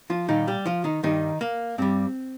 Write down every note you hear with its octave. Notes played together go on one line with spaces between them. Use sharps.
F3 F4
A#2 D#3 G3 D#4
G3 G4
F3 F4
D#3 D#4
G2 D#3 G3 D#4
A#3
G2 G3 C4